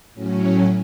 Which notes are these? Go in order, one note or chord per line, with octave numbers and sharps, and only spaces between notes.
A2 F#3 C#4